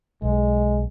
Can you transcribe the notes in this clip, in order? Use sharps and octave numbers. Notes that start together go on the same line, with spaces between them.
B1 G#3